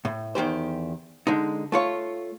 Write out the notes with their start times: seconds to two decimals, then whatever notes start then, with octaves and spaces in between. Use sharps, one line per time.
0.05 A2
0.35 E2 D#3 G4 C5
1.27 D3 G#3 D#4
1.72 A3 F4 C#5